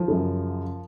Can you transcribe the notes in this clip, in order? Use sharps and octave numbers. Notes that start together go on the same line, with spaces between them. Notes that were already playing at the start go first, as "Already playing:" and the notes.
Already playing: F3
F#2 C#3